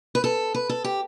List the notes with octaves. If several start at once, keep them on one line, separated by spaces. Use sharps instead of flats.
B4
A4
B4
A4
G4